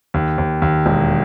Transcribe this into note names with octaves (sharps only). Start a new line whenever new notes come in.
D#2
D#2
D#2
E1